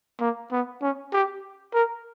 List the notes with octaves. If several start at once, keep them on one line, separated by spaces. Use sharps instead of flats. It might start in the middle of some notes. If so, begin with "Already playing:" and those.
A#3
B3
C#4
G4
A#4